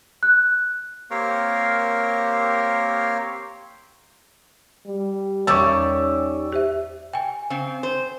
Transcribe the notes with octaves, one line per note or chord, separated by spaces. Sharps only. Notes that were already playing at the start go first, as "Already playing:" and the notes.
F#6
A#3 C4 G4 A#4 C#5 F5
G3
E2 D#3 G3 C#4 C#6 D6 E6 A6
G4 C5 E5
G5 G#5
C#3 C4
C5